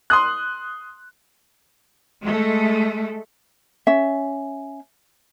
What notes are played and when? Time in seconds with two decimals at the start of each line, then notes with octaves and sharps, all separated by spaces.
0.10 C6 D#6 F#6
2.22 G#3 A3
3.87 C#4 E5